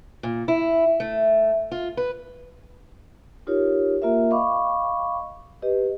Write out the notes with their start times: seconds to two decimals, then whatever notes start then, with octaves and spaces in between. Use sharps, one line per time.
0.23 A#2
0.48 E4
1.00 A3
1.71 F4
1.97 B4
3.47 D#4 F4 G4 A#4 C#5
4.02 A#3 F4 A#4 E5
4.31 D#5 F5 B5 C#6 D6
5.62 G4 B4 D#5